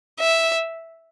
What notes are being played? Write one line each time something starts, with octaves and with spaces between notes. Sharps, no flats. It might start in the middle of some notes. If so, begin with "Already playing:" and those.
E5